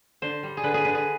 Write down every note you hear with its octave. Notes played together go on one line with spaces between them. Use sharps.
D3 C5
G3
G#4
D3 B4
G#4
D3 B4
G#4